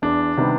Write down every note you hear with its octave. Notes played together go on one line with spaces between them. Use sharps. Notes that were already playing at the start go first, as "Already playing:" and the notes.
E2 D4
C3 D#3 G3 B3